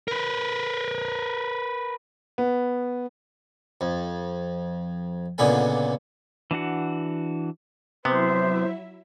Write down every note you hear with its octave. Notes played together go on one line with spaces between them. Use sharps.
A#4 B4
B3
F2
C#2 A#2 D3 B3 G#5
E3 D4 F#4 F#5
C3 F#3 B3 E4 C5 E5